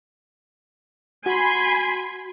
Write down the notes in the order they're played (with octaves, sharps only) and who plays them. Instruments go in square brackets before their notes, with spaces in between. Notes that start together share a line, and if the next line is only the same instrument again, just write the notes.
[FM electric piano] F#4 [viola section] G#5 B5 C6